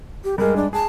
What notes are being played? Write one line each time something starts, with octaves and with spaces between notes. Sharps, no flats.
G4
G2 G#3 A#4
D4
G#4 A5